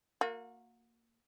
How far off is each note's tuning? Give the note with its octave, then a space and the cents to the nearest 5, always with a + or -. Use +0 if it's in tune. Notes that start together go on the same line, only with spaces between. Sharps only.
A#3 -15 F#4 -35